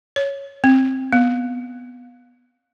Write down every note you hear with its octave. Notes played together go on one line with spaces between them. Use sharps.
C#5
C4
B3